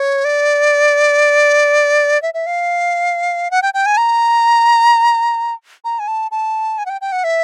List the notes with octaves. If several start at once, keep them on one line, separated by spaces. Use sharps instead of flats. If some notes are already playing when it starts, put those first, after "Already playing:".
Already playing: C#5
D5
E5
E5
F5
F#5
G5
G5
G#5
A#5
A#5
G#5
A5
A5
G#5
F#5
G5
G5
F#5
E5